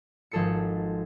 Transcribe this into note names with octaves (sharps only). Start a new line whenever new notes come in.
G#1 F3 G#4 A4 C7 C#7